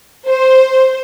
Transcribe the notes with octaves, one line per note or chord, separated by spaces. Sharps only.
C5